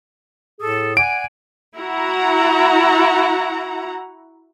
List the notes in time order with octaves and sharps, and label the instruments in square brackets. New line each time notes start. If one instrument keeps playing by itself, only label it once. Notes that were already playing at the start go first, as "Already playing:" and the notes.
[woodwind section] A2 G#4 A4
[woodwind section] D5 F#5 G#5 [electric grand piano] D7
[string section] E4 F#4 F#5 A#5